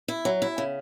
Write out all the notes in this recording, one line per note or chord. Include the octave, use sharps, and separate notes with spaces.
E4
F#3
E4
C#3